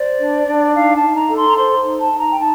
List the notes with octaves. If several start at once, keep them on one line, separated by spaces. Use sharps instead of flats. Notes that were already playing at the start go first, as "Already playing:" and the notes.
Already playing: C5 D5
D4
D4
D#4 F5
A5
D#4
A#5
A4
C6
A#5
C5 C6
D#4
A5
D#4
A#5
G5
D#4 A5